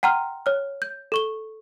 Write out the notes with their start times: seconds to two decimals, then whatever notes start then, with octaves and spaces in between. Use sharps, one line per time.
0.03 F#5 G5 A#5 C6 F6
0.46 C#5 F6
0.82 G6
1.12 A4 C#6 G7